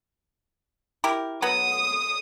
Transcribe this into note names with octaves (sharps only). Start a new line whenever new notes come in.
E4 G4 A#4
F#3 B3 D#6